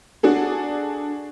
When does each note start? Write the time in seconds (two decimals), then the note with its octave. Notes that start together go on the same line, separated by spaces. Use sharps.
0.23 D4 F#4 G#4 A4